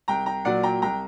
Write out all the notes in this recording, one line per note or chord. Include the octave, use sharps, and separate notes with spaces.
C2 G5 A#5
G5 A#5
A#2 F#3 D5 F#5
G5 A#5
C2 G5 A#5